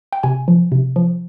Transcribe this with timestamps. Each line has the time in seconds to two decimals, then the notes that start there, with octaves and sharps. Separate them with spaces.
0.12 G5
0.23 C3 G#5
0.48 F3
0.72 C3
0.96 F3